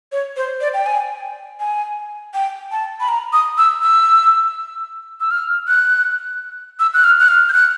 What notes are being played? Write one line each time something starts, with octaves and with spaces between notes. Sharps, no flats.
C#5
C5
D5
G5
G#5
G#5
G5
A5
B5
A#5
D#6
E6
E6
E6
F6
F#6
E6
F#6
F6
F#6
F6
G6
F#6